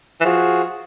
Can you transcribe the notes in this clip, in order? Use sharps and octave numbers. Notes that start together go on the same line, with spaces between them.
E3
F3 F#4 G#4